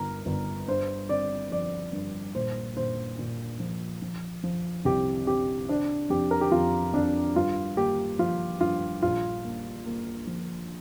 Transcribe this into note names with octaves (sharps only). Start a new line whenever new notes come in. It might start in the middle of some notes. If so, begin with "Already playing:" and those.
Already playing: G1 A#4
G1
G2 C5
C4 D5
F3 D5
G2
A#2 C5
A#2 C5
A#2
F3
F3
F3
C2 G4
C3 G4
C4 D4
F2 G4
A#4
G4
F2 F4
F2 D4
G2 F4
A#3 G4
F3 F4
G2 F4
A#1 F4
A#3
A#3
F3